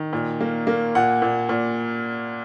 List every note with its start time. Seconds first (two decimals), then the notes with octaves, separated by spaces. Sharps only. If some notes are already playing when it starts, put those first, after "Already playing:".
Already playing: D#3
0.13 A#2
0.41 A#3
0.67 A#3
0.95 A#2 F#5
1.22 A#2
1.49 A#2